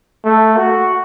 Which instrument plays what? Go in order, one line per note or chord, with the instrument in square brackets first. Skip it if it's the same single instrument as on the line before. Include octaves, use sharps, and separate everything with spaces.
[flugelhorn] A3
F#4